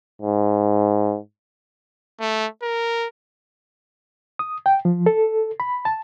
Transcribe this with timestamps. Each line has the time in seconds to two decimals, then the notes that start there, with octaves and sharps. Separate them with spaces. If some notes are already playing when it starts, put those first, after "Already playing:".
0.22 G#2
2.20 A3
2.62 A#4
4.39 D#6
4.66 G5
4.85 F3
5.06 A4
5.60 B5
5.85 A5